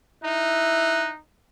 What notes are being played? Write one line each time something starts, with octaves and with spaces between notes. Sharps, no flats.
D#4 E4 F#6